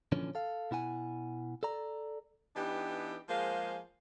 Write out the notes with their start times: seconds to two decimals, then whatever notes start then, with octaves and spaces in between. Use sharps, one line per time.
0.12 A#2 D3 E3 F3 C#4
0.35 A4 F5
0.71 B2 E4 F#5 G#5
1.63 A4 D5 A#5
2.55 E3 B3 D4 D#4 G4
3.28 F3 G#3 A#3 G#4 C5 F5